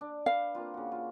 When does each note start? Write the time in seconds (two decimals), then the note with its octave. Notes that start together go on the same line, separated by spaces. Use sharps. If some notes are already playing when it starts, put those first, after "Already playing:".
0.01 D4
0.26 B4 F5
0.55 A#3 C4 F4
0.74 C#3 F#4
0.92 F4